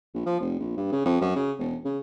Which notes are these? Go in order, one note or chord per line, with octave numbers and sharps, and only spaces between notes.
A#1
F3
F1
A#1
G2
C#3
F2
F#2
C#3
E1
C#3